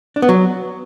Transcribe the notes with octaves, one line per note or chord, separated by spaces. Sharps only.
D4
B3
F#3